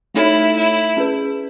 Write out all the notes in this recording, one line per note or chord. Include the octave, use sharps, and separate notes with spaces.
A3 D#4 E4 A4 C#5
E4
C#4 G#4 B4